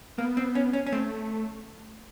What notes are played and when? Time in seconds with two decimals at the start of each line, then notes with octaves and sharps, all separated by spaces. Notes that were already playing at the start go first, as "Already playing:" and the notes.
0.18 A#3 B3
0.37 C4
0.55 C#4
0.73 C#4
0.86 C#4
0.92 A3 C4